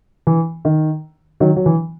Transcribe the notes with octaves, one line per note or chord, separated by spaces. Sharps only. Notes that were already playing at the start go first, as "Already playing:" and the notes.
E3
D#3
D#3 F#3
F#3
E3